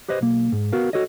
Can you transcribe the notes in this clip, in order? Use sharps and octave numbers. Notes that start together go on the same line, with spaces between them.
G4 B4 C5 D#5
B1 A#3
G#2
B3 F#4 A#4 F5
F#4 A4 C#5 D#5